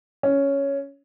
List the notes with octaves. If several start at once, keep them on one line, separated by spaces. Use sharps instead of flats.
C#4